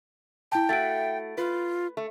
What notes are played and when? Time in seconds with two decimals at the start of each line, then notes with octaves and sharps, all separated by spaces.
0.52 E4 G5 A5
0.69 A3 E4 F#4 A6 D7
1.38 F4 B4
1.97 A3